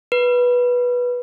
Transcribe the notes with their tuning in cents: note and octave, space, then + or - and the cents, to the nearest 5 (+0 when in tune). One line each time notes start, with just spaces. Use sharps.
B4 -10